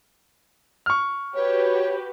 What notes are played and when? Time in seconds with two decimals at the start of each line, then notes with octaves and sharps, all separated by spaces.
0.86 C#6 F6
1.34 F#4 G4 B4 C#5